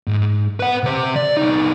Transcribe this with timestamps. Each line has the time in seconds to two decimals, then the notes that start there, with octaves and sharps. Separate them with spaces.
0.07 G#2
0.60 B4 F#5
0.83 C3 C5
1.16 D5
1.37 C2 D#4